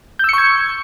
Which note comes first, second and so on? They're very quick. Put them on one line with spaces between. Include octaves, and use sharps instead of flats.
G6 E6 C#7 C#6 G#6